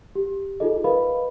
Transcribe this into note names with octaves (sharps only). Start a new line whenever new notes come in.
G4
D#4 F4 G#4 A4 D#5
A#4 B4 D#5 F5 B5